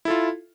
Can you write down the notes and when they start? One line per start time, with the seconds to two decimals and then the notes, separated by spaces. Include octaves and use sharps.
0.05 E4
0.08 A4
0.10 F4